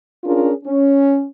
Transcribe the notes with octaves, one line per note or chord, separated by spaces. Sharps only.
C#4 D4 F4 G#4 A#4
C#4